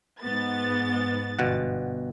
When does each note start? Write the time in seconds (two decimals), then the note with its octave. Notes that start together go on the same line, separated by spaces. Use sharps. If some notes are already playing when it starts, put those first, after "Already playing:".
0.21 G#2 B3 A6
1.39 G1 B2 F#5